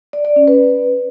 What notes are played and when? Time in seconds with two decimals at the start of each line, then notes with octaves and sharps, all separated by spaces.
0.13 D5
0.25 D5
0.36 C#4
0.48 B4